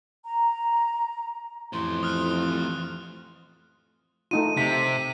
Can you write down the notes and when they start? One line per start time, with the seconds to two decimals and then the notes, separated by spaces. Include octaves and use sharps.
0.24 A#5
1.73 F2 A2 E3 C6
2.03 D#6 F6 F#6
4.31 A3 D#4 F4 D#7
4.57 C3 B6